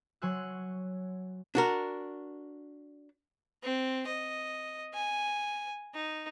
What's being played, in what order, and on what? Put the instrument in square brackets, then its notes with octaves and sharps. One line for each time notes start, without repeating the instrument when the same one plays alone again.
[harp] F#3 C#5 G#5 C6 E6 F#6
[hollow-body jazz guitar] D4 F#4 A#4
[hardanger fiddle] C4
D#5
G#5
D#4